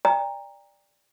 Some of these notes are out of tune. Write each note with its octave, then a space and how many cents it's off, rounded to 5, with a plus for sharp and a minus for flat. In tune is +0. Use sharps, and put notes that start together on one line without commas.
D5 +0 G5 +35 A#5 +0